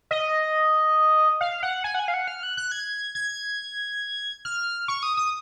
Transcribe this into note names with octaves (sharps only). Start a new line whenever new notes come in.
D#5
F5
F#5
G#5
F#5
G#5
F5
F#5
F6
F#6
F#6
G#6
G#6
F6
C#6
D#6
D#6